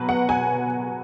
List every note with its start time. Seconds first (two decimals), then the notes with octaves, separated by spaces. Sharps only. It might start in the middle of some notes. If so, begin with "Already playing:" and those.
Already playing: B2 F#3 B4
0.09 F#5
0.29 G#5